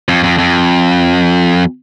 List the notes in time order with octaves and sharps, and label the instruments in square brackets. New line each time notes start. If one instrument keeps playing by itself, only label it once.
[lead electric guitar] F2
F2
F2